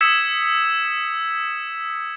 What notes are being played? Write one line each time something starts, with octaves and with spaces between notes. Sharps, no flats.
D#6 E6 G#6 B6 C#7 E7